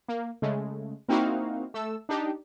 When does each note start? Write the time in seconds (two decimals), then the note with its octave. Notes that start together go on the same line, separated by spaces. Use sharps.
0.08 A#3
0.42 C#3 G#3 A3
1.08 A#3 C4 D#4 E4 F#4 F5
1.74 A3 A4 E6
2.09 D4 D#4 G4